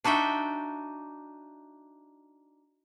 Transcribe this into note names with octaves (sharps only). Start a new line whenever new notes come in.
D4 D#4 F#4 E5 G5